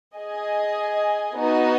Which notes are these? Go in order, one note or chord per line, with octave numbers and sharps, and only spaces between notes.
G#4 D#5 G#5
B3 D#4 F#4 D#5